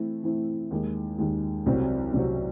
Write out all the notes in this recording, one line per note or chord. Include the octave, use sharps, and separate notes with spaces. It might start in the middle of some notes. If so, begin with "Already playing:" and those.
Already playing: E3 A3 C4 E4
E3 A3 C4 E4
D#2 D#3 G#3
D#2 D#3 G#3
C2 C3 F#3 C4 F#4
C2 C3 F#3 C4 F#4